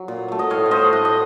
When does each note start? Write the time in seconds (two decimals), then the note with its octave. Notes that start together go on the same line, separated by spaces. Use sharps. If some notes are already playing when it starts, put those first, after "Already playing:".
Already playing: F#3
0.08 A#2
0.28 F#3 A3
0.39 D#5
0.50 A2 C#5 F5
0.66 C#5
0.71 A3 C5 D#5
0.93 A2 D#5 F#5
1.05 D#5